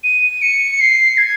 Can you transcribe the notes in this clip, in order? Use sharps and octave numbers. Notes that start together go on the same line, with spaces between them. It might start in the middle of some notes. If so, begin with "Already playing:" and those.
D#7
C#7
C7
G#6